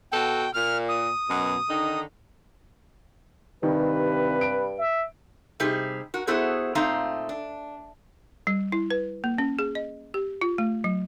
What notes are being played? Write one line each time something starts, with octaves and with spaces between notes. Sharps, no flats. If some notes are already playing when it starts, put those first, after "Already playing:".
B2 F#4 A4 G5
A#2 F6
D#6
F#2 B2
D3 D#3 D#4
G2 C3 D#3 B4
D7
E5
C3 G3 D#4 G4 G#4
F#4 A#4
B3 E4 F#4 G#4 A4 C5
A#2 A3 C4 D#4 F5 A#5
D4
G3
E4
B4
A#3
C#4
G#4
D#5
G4
F4
A3
F#3